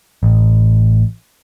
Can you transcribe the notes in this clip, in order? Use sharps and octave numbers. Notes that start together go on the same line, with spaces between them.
A1